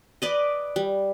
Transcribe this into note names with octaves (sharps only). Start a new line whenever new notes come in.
B4 D5 D#5
G3